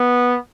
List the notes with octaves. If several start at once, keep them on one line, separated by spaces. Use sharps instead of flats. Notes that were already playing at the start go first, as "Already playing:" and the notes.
Already playing: B3